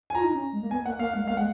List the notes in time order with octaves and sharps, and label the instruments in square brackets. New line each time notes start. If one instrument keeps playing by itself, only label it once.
[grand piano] G#5
[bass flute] F4 [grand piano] A#5
[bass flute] D#4
C#4
G#3
A#3
[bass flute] B3 [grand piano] G#5
[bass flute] A#3 [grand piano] F#5
[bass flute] A#3 [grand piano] F5
[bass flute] G#3 [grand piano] F5
[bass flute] A#3 [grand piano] F5
[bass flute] G#3 [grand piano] F#5